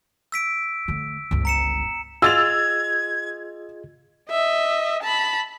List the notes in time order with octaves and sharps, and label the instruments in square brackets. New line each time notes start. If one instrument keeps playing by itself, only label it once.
[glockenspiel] E6 B6 D7
[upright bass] D3 A3
G1 C#2
[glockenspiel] A#5 C#7 E7
[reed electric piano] F4 G#4 D#5 [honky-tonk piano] E6 A6 F7 [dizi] G#6
[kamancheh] D#5 E5
A5 B5